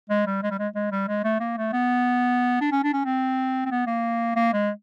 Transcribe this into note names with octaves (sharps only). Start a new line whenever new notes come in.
G#3
G3
G#3
G3
G#3
G#3
G3
G#3
A3
A#3
A3
B3
D4
C#4
D4
C#4
C4
C4
B3
A#3
A#3
G#3